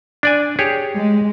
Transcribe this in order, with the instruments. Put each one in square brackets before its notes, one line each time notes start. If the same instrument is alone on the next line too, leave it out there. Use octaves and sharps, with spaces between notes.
[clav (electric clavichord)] D4 D5 G#5
G4 G#4 C#5
[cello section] G#3